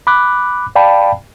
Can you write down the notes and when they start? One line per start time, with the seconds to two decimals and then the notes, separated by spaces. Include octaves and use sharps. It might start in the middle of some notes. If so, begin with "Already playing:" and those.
0.07 B5 D6 F#6
0.76 D5 F5 G5 A5 B5